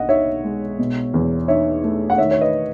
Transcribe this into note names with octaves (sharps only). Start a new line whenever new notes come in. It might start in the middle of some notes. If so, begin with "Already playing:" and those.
Already playing: B1 B2 D#5 F#5
D#4 C#5 E5
G#3
B2
E2
D#4 C#5 E5
A3
F#5
D#3 C#5 E5
C#5
B4 D#5